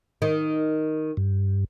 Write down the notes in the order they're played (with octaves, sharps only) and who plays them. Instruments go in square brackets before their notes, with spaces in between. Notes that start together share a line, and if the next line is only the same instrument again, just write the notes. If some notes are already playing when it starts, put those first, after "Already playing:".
[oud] D#3
[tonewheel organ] G2